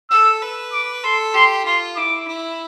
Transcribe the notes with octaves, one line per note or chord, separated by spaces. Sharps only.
A4 E6
B4
D6
A4 C6
G4 C6
F4 C6
E4 D6
E4